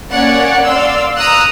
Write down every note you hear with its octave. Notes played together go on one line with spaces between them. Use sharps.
A#3 C#4 C#5 D5 F#5
D5 F5 C6 E6
A#5 D#6 E6 F#6